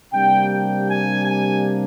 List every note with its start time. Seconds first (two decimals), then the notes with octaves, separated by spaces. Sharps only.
0.13 C3 G3 A#3 D4 G5
0.50 G5
0.88 G#5
1.24 G#5